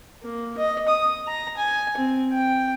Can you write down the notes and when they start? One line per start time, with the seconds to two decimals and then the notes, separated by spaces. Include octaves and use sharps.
0.24 A#3
0.57 D#5
0.88 D#6
1.27 A#5
1.57 G#5
1.97 C4
2.32 G5